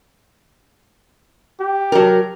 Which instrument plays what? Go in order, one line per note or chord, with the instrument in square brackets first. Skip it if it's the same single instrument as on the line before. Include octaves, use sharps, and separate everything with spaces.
[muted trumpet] G4
[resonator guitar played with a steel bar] F#3 A#4